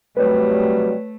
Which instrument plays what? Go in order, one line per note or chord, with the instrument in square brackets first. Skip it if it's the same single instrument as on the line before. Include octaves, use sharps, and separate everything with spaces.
[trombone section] C3 F#3 G3 [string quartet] A3 [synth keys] B4 C#5